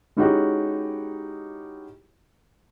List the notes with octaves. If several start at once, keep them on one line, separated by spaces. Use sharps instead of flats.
G#3 C#4 D#4 E4 F#4 G4